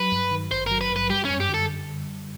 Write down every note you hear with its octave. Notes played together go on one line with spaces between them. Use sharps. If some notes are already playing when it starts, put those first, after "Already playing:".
Already playing: F#3 B4
G2
D#3
G#1 C5
F#3 A#4
B4
G2
B4
G3 G4
C#4
F#2
G4
D3
A4